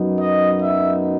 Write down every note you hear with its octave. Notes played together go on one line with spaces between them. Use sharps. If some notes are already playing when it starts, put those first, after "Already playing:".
Already playing: F#2 F#3 B3 D#4
D#5
E5